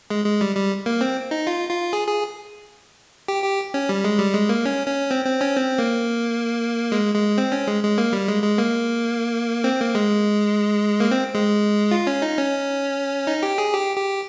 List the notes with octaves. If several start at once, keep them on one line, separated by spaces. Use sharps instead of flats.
G#3
G#3
G3
G3
A#3
C4
D#4
F4
F4
G#4
G#4
G4
G4
C#4
G3
G#3
G3
G#3
A#3
C#4
C#4
C4
C4
C#4
C4
A#3
G#3
G#3
C4
C#4
G#3
G#3
A#3
G3
G#3
G#3
A#3
C4
A#3
G#3
A#3
C4
G#3
F4
C#4
D#4
C#4
D#4
G4
G#4
G4
G4